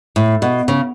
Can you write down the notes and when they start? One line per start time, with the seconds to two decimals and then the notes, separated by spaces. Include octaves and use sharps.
0.16 A2
0.42 B2
0.68 C#3